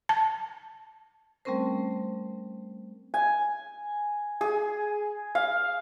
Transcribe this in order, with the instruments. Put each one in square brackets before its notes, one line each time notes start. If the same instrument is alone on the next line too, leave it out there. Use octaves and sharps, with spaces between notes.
[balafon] A5
[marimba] G3 A3 C4 C#4 A#4 C5
[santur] G#5
G#4
F5